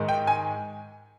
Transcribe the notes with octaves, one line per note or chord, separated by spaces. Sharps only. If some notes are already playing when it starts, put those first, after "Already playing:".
Already playing: G#2 D#3 G#3
G5
G#5